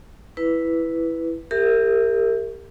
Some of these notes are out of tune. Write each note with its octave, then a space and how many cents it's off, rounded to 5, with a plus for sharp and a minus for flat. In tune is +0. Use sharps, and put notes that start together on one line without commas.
E4 +0 B4 +0
G4 +25 A#4 -25 E5 +0